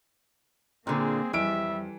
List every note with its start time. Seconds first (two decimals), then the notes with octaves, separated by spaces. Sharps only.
0.87 A#2 D3 A#3 C4 G#4
1.33 F2 E3 G3 E5 D7